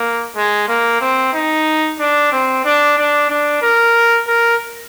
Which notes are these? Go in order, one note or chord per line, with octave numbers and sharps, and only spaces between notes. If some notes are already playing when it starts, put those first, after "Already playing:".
Already playing: A#3
G#3
A#3
C4
D#4
D4
C4
D4
D4
D4
A#4
A#4